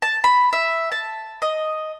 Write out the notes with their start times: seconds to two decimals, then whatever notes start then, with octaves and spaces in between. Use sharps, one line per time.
0.02 A5
0.24 B5
0.53 E5
0.92 A5
1.42 D#5